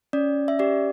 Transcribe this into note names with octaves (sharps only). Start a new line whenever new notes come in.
C#4 D5
E5
G4 D5